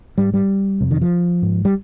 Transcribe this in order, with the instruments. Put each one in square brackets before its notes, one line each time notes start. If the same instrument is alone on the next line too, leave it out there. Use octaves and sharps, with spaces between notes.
[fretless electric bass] G#2 G3
G3
F2 C3
D#3
F3
G#2
G3